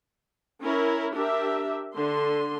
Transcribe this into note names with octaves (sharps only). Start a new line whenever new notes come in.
C#4 E4 A#4
D4 G4 A#4 E5
D3 C6